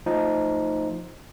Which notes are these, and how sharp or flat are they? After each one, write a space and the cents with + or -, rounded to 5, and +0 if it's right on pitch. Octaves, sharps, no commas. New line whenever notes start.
F3 +0 A3 +25 D#4 +5